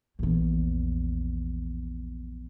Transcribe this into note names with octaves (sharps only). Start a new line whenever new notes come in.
A#1 E2